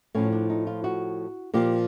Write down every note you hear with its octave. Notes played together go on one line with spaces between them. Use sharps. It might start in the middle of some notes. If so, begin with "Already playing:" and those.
A2 F3 C#4
D4
D#4
F4
F#4
A#2 F3 G4